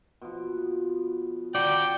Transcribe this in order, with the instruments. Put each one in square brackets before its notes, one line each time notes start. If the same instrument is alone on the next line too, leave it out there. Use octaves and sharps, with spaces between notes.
[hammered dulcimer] B2 F3
[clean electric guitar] F#4 D5 [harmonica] G5